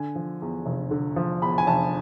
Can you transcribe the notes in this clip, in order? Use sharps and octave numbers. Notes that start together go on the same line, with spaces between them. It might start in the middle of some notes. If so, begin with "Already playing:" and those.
Already playing: D3 G#5
F3
E2
F1
D3
F3
E2 B5
G#5
F1 A5